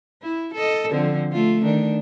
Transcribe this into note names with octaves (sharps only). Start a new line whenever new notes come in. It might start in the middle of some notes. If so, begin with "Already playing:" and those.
E4
A4 D#5
D3 F3 C4
A3 F4
D#3 D4